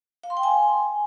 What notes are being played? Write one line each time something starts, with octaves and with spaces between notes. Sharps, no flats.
F5
C6
G5
G#5